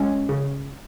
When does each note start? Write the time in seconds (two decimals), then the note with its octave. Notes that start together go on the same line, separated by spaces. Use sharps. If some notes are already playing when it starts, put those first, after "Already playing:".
Already playing: G#3 C#4
0.29 C#3